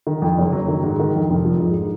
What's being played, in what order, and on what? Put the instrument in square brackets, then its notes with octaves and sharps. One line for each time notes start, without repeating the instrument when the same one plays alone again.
[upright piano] D#3
F2
F#1
F#3
D#3
G#2
D#3
F2
F1
F3
G#2